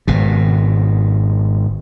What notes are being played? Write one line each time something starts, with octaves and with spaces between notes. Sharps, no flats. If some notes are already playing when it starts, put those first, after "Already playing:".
G#1 B2